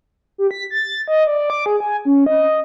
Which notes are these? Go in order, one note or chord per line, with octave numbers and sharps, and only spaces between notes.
G4
B6
A6
D#5
D5
D6
G#4
G#5
C#4
D#5